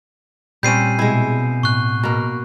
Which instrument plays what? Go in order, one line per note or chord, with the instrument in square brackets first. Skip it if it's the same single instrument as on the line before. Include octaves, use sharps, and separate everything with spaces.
[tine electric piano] A#2 [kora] G3 C4 C#4 [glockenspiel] G6 C7 D#7
[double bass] B2 [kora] G#3 E4
[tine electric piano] A2 [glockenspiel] C#6 F#6
[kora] B2 A#3